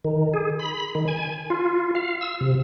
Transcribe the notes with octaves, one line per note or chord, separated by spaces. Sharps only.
D#3
G#4
B5
D#3
G#5
F4
F5
E6
C3